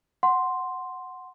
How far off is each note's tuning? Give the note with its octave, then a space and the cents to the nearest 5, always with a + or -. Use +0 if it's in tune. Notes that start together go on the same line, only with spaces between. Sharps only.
F#5 +0 C6 +0